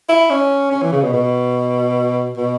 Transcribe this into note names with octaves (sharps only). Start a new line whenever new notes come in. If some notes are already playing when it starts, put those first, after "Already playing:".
E4
C#4
C#4
E3
C#3
B2
B2
B2